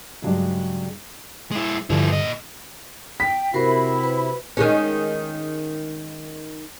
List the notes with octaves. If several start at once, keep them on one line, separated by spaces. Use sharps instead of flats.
G2 C#3 F#3 G#3 D4 G4
G#3 E4
G2 D3 F3 E4
A#2 D#5
G5 B6
C3 E4 F#4 A#4 C5 B5
B4
D#3 G#3 C#4